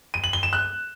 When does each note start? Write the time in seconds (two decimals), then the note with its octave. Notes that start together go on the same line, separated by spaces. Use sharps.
0.14 D#7
0.24 F#7
0.33 G7
0.43 E7
0.53 F#6